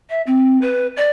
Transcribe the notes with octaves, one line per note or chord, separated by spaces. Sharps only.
E5
C4
B4
D5